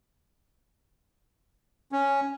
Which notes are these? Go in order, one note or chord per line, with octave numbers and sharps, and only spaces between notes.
C#4